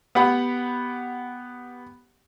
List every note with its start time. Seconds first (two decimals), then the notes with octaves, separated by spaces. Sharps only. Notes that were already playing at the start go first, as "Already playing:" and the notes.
0.15 B3 G4 F#5 B5